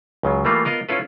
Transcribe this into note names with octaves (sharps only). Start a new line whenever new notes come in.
C#2 C#3 F#3
E3 G3 A3 A#3 F4
B3 F4 A#4 D#5
C#4 E4 F4 A4 B4